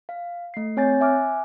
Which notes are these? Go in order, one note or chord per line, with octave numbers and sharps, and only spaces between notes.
F5
A3 C7
C4 C#5 G#5 G6 A6
E5 G#5 D6 F6 F#6